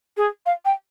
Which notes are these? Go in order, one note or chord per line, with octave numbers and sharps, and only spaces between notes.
G#4
F5
G5